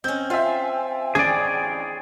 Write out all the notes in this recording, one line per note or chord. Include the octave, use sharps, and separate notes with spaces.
C4 C#4 D#5 G6
F4 C5 E5 G5 G#5
A1 D4 G#4 D5